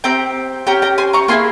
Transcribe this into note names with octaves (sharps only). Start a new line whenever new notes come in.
C4 G4 G5 A#5
C#4 G4 G5 A#5
G5 A#5
G#5 C6
A#5 C#6
A#3 E4 G#4 G#5 C6